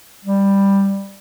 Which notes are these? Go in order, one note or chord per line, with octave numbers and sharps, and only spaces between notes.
G3